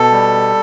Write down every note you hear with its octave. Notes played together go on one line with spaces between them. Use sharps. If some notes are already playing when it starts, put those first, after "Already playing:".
Already playing: B2 A4
G3